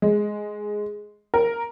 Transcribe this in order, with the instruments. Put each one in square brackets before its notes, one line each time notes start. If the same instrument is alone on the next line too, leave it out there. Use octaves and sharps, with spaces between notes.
[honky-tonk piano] G#3
A#4